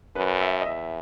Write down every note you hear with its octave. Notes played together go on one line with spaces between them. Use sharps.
F#2 B4
E5
D#5
E2 E5